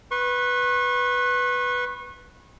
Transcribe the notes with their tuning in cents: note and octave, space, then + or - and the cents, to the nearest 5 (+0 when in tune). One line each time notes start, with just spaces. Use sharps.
B4 +0 C#6 -40